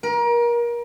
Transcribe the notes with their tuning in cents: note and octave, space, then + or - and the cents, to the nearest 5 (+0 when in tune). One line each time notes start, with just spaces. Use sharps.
A#4 +30